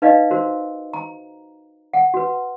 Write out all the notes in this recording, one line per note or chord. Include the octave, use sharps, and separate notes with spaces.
D#4 B4 D5 D#5 F5
F#4 A#4 C5
A#5
F#5
F#4 B4